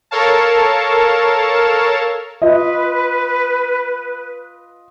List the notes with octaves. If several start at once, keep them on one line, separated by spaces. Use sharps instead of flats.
A4 A#4 C#5 F5 A5
F4 B4 D#5